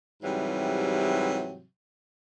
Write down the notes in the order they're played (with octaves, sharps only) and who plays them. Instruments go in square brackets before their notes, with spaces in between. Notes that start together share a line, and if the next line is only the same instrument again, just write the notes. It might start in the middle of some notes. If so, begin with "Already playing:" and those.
[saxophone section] G#2 C3 E3 F#3 G3